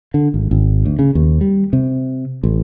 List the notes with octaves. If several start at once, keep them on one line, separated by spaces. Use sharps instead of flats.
D3
G#1
G#1
D2
C#3
D#2
G3
C3
A1